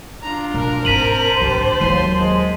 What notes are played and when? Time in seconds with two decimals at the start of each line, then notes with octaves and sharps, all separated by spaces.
0.23 D4 F4 A#5
0.54 B2 A#4
0.85 G#2 C4 C5 A5 B6 D#7 F#7
1.41 A1 D2 G4
1.81 D#2 F#3 C6 D#7
2.22 G#3